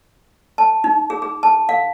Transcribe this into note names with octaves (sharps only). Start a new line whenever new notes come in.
A5
D#4
G#4
G#4
A5
F5